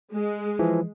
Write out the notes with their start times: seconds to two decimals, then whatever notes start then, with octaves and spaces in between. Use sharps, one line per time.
0.13 G#3
0.59 E3 F3